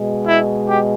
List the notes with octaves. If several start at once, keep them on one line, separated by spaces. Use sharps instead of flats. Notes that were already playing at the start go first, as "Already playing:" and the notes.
Already playing: B2 G#3
E4
G4